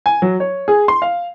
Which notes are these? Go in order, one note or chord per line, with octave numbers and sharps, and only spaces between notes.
G#5
F#3
C#5
G#4
C6
F5